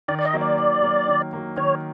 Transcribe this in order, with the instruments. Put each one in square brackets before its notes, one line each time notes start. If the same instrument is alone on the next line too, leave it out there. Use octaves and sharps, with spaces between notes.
[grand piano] D#3 [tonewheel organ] D5
[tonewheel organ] D5
D#5
[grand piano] F#3 A#3
[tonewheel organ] D5
[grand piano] D#3
F#3 A#3
D#3
F#3 A#3
[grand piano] D#3 [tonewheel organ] C#5